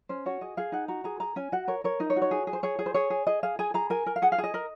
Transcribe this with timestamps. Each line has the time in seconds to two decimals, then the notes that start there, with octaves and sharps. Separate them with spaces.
0.09 C#4 C5
0.26 F#4 C#5
0.41 G#4 D#5
0.57 G#4 F5
0.72 D#4 F#5
0.88 F#4 A#5
1.04 G#4 A#5
1.20 G#4 A#5
1.36 C#4 G#5
1.52 F#4 F#5
1.68 A#4 C#5
1.84 A#4 C#5
2.00 D#4 D#5
2.10 C#5
2.16 F#4
2.22 C#5
2.31 G#4
2.47 G#4
2.53 C5
2.63 G#4 C#5
2.79 G#4
2.86 C5
2.94 G#4 C#5
3.10 G#4
3.27 G#4 D#5
3.43 G#4 F5
3.59 G#4 G#5
3.74 G#4 A#5
3.90 A#4 G#5
4.06 A#4
4.16 F5
4.22 G#4 F#5
4.32 F5
4.38 G#4
4.44 D#5
4.54 A#4